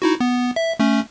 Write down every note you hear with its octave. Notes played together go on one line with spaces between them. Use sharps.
D#4 E4 F#4
B3
E5
A3 C#4